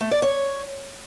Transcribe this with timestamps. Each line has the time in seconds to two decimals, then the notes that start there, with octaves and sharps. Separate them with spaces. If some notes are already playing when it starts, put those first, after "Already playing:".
0.01 A3
0.11 D5
0.22 C#5